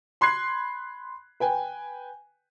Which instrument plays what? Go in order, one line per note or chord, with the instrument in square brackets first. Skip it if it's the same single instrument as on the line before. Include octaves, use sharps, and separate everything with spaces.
[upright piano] B5 C6 F#6 G#6 C7
B4 G5 G#5